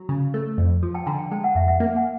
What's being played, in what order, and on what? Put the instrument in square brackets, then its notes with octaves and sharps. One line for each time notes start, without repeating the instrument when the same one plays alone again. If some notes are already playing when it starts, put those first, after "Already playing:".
Already playing: [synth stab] F#3
C#3
A3
F2
F3
[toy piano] G5 A5
[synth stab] D3 [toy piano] G#5 A#5
[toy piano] G5 A5
[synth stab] G#3 [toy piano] G5 A5
[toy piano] F#5 G#5
[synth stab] F2 [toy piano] E5 F#5
[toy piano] E5 F#5
[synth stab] A#3 [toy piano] E5 F#5
[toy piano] F#5 G#5